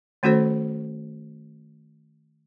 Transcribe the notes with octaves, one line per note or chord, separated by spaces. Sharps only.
D#3 A3 C#4 F#4 A4 C5